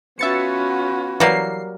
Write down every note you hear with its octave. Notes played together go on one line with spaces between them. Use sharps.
B3 C#4 F4 F#4 B4 E5 A6 C#7
E3 F#3 G3 A#3 C7